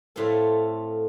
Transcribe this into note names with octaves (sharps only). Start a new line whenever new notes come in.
A2 A3 C4 F4 A4